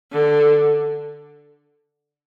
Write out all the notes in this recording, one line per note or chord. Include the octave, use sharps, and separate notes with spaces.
D3